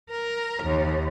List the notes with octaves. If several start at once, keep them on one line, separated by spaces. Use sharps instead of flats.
A#4
D#2